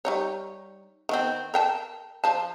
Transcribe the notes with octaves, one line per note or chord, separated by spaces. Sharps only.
G3 D#4 C#5
D#3 B3 C4
A#4 G5 A5
F3 A5